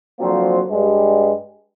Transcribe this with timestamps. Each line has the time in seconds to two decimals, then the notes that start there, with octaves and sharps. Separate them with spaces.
0.20 D3 F3 F#3 A#3 C4 C5
0.70 G2 G3 G#3